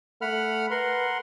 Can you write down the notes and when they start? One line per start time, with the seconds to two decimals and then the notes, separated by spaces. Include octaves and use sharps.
0.22 A3 F#5 B5 F6
0.71 A#4 B4 F#5 C6